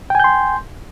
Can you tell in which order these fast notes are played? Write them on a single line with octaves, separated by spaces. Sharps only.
G5 G#5 G6 C6